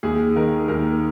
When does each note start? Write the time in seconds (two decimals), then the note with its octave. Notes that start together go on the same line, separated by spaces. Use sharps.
0.03 D#2 G#4
0.36 D#3 A#4
0.68 D#2 A#4